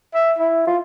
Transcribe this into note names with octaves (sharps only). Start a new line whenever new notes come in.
E5
E4
F4